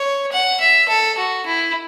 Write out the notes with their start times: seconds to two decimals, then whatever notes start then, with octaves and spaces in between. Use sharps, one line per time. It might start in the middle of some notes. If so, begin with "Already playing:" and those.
Already playing: C#5
0.32 F#5
0.60 E5
0.89 A4
1.18 F#4
1.47 E4